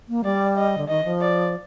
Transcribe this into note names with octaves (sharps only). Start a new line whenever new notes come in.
A#3
G3 D5
D#5
D3
D#3 D#5
F3
D5